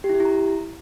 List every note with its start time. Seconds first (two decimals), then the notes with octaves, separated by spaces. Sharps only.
0.04 G4
0.09 E4
0.15 G4
0.20 E4
0.25 A#5